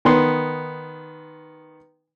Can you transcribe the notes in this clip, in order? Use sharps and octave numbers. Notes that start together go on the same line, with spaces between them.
D#3 B3 C6